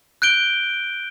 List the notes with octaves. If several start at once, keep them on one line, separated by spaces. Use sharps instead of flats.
F#6 G6 D7 G7